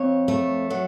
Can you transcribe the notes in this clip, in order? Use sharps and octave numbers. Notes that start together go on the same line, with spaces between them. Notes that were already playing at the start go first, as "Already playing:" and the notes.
Already playing: F2 C#5
A3
F#3